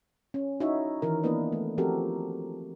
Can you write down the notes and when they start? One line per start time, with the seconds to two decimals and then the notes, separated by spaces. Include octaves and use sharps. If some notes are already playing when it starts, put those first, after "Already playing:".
0.34 C#4
0.60 D#4 E4 F#4 C#5 E5
1.02 D#3 E3 A#4
1.23 A#3 B3 D4 E4 B4 D#5
1.52 A3
1.78 F3 C4 F#4 G4 A4 A#4